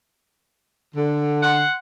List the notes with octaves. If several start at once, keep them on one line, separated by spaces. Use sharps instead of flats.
D3
F#5 C6